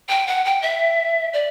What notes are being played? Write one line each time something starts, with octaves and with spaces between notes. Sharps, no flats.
G5
F#5
G5
E5
D5